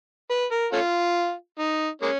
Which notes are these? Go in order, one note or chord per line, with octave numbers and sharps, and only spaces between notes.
B4
A#4
A3 C#4 F4
D#4
G#3 A#3 C#4